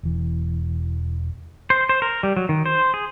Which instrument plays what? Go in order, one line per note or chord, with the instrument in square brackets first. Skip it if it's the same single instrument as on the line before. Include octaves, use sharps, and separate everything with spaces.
[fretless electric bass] E1 E3
[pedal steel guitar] C5
C5
A#4
G3
F#3
D#3
C5
G#4